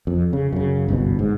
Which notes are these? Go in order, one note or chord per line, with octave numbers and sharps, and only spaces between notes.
F2
C#3
F#2 C#3
G1 C2 G2 B2
G#2